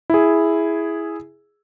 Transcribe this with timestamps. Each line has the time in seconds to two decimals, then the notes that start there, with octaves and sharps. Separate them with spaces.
0.10 E4 G#4